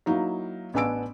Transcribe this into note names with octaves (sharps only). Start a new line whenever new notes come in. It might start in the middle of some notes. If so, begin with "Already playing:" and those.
F#3 A#3 D#4 E4
A1 B3 D4 G#5 E6 D7